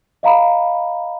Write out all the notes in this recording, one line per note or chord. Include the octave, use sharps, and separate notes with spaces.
D#5 F5 A#5 B5